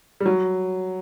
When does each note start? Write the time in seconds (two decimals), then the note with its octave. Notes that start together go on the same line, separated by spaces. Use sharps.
0.20 G3
0.26 F#3